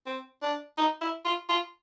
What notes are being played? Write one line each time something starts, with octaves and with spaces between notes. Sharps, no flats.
C4
D4
D#4
E4
F4
F4